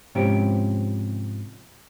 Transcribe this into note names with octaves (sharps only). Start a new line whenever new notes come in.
G#2 C3 F3 C#4 E4 G4